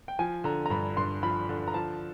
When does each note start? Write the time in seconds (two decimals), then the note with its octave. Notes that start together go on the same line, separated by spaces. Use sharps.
0.08 G5
0.19 F3 G#5
0.44 D3 A#5
0.66 A#5
0.70 G2 B5
0.97 G2 C6
1.23 F3 B5
1.49 D3
1.68 A#5
1.74 F3 A5